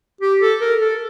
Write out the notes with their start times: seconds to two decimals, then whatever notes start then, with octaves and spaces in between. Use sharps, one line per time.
0.21 G4
0.41 A4
0.61 A#4
0.81 A4